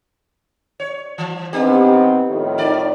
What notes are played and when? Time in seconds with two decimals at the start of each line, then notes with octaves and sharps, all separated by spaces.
0.80 C#5
1.18 E3
1.53 D#3 B3 C4 D4 G4
2.27 F2 A2 D#3
2.58 D#4 D5